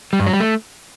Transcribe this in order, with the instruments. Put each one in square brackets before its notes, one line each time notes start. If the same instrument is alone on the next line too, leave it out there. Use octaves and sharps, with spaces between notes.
[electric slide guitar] G3
G2
F#3
G3
A3